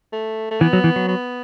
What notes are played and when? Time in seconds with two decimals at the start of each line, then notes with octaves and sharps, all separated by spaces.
0.13 A3
0.51 A3
0.61 E3 B3
0.73 F#3
0.84 E3
0.96 F#3
1.08 B3